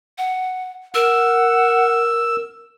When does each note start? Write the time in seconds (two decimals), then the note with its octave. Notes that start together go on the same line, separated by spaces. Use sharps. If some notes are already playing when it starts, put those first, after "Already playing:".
0.18 F#5
0.95 A#4 F#5 E6